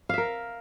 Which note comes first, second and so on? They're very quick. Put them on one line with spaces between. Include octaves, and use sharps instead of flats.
F5 E5 A#4